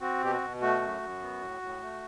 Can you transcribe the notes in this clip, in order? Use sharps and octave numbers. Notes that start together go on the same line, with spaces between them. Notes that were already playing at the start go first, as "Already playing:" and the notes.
C4 F#4
B2 G4
F#4
B2
A3 F#4
F#2
F#2
B3
A2
A2
A3